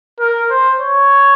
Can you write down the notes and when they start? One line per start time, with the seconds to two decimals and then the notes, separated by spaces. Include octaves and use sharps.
0.20 A#4
0.51 C5
0.80 C#5